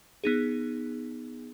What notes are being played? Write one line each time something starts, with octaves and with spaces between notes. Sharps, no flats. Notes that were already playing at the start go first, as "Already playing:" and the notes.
B3 D#4 G#4